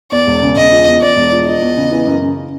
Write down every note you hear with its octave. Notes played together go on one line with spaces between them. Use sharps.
E2 D5
E1
C#3
E1 D#5
F3
E2
E2 D5
E1
F3
F3 D#5
E2
C#3
E3
F#2
C#3